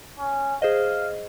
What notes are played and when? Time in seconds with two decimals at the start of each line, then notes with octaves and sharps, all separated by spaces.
0.19 C#4
0.62 G#4 C5 D#5 F5